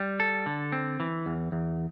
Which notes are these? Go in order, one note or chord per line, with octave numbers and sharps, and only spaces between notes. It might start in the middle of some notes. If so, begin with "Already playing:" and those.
Already playing: G3
A4
D3
C4
E3
E2
E2